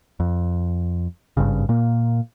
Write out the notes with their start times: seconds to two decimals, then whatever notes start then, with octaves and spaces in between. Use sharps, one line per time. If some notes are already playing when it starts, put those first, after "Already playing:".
0.20 F2
1.37 G#1 G2 C#3
1.69 A#2 A#3